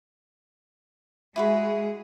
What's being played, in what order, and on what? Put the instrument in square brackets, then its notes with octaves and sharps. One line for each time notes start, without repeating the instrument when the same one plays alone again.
[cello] G#3 G#4 [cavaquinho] E4 F#4 B5